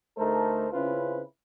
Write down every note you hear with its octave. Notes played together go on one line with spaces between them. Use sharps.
D2 A3 D#4 A4 A#4 C5
C#3 C4 C#4 E4 F4 B4